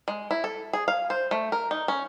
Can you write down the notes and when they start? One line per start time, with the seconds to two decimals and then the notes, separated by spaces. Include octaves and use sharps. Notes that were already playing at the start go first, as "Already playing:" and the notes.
0.08 G#3
0.31 E4
0.44 A4
0.73 G#4
0.88 F5
1.10 C5
1.31 A3
1.52 A#4
1.71 D#4
1.88 C#4